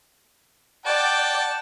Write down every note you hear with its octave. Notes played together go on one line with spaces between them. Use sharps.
D5 F#5 G5 A5